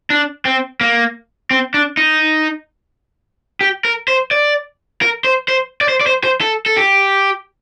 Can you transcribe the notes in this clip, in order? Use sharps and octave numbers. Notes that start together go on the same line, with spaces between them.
D4
C4
A#3
C4
D4
D#4
G4
A#4
C5
D5
A#4
C5
C5
D5
C5
D5
C5
C5
A4
A4
G4